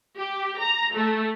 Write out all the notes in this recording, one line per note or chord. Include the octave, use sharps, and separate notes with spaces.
G4
A#5
A3